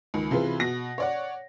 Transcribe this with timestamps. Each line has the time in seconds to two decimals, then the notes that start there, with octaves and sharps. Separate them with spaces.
0.14 C#2 D#3
0.31 C3 E3 F4 G#4 B4
0.60 B2 A#6
0.98 C#5 D5 F#5